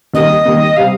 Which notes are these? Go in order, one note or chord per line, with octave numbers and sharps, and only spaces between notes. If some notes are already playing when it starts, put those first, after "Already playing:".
D#2 D#3 G3 A#3 D#5
D#2 D#3 G3 A#3
C3 G3 C4 F5